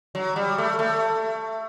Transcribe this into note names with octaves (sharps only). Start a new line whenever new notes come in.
F#3
G3
A3
A3